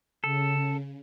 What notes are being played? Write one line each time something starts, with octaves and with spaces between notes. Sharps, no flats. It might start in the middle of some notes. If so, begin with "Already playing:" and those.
C#3 A4